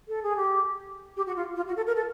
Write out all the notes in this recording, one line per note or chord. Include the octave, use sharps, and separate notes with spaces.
A4
G#4
G4
G4
F#4
F4
F4
F#4
A4
A#4
A4